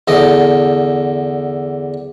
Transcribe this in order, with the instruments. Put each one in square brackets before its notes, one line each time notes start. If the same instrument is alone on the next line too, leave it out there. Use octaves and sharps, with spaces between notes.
[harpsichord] E2 D3 D#5